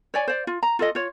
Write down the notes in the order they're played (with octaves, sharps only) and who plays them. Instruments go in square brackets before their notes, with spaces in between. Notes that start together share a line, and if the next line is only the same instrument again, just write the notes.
[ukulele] C#5 D5 G#5
C5 D5
F4
A#5
F4 A4 D#5
F4 C#5